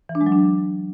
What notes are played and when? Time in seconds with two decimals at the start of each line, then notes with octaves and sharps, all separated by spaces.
0.09 E3
0.15 D4
0.21 G#3
0.26 F#3
0.32 D4